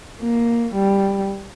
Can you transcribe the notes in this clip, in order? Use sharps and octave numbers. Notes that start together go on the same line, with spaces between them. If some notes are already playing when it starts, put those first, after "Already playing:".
A#3
G3